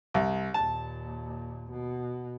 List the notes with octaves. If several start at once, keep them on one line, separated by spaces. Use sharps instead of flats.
C2
D#2 A#2 A5
B2